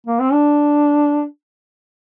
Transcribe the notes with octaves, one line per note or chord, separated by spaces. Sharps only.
A#3
C4
D4